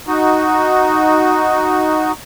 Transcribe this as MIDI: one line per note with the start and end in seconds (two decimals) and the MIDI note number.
0.07 2.12 63
0.07 2.12 66